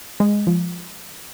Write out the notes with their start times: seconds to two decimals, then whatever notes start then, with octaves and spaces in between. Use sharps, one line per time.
0.20 G#3
0.47 F3